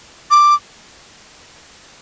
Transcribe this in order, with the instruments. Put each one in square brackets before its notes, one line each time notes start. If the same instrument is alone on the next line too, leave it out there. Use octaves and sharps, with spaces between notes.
[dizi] D6